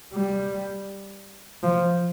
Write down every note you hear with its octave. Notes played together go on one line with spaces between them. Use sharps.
G3
F3